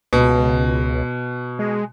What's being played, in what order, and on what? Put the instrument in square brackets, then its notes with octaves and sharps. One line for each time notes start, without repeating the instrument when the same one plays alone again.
[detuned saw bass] C#2 [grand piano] B2
[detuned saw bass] G#3